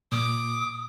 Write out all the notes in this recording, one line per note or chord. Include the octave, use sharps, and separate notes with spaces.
A#2 D6 D#6